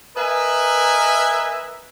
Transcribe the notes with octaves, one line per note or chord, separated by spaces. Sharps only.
A#4 B4 D#5 E5 G#5